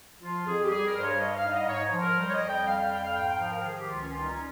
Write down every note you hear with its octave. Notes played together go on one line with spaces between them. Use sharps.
F3 F4
F2 G#4
G4
G3 G#4
A#4
G2 C5
C#5
G3 D#5
F5
G#2
D#5
G#2 C#5
F3
A#4
G3 C5
C#5
D#5
F2
G5
G3 F5
F5
F2 G5
F5
G#2 G5
G5
F3 F5
A#4
D#3 G#4
G4
C#2 F4
C#4
G3 F4
D#4
C#4